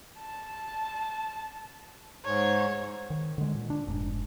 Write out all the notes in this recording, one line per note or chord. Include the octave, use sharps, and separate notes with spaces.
A5
G#2 C#5
D#3
D3 G#3
A#2
D4
F1 G#2